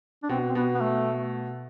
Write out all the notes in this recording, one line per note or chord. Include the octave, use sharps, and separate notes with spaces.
D4
B2 C4
C4
B2 B3
B3
A3